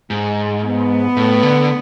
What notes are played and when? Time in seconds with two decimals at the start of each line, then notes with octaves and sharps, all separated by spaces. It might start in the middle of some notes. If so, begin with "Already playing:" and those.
0.10 G#2
0.64 B3
1.17 A2
1.43 D3